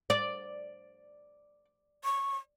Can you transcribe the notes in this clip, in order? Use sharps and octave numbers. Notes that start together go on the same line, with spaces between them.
D5
C#6